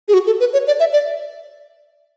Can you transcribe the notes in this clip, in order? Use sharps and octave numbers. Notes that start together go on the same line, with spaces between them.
G#4
F#4
A4
B4
C#5
D5
E5
D5